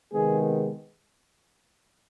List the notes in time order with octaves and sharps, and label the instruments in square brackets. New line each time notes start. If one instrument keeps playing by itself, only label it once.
[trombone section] C3 D#3 G#3 B3 G#4